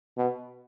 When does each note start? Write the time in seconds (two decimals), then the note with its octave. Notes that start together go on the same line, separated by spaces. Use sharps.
0.17 B2